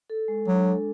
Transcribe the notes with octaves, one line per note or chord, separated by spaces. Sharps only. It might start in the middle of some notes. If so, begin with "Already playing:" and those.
A4
G#3
F#3 D4
A4